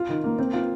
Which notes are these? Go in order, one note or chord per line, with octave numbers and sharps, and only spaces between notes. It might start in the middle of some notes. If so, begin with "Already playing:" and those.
Already playing: F4
D#3
A#3
C4
F4